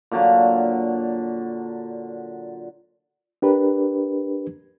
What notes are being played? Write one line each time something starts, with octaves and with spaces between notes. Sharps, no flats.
A#2 D3 F#3
D4 G4 A#4 B4